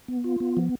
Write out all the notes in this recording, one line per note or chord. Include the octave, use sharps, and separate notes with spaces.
B3
F4
B3
F3